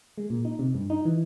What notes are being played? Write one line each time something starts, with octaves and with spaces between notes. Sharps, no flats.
G#3
A#2
D#4
C3
G2
D#4
E3